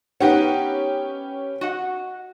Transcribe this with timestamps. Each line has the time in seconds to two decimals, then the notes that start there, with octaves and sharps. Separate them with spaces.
0.20 B3 C#4 D#4 G4 B4 F#5
1.61 F#4 D#5 F#5